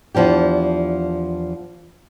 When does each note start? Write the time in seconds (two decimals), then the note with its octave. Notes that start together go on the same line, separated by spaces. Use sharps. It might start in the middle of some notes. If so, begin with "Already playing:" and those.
0.15 E2 F3 D4 G4